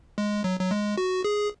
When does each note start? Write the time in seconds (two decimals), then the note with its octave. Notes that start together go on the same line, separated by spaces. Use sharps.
0.18 G#3
0.44 F#3
0.60 F#3
0.71 G#3
0.97 F#4
1.24 G#4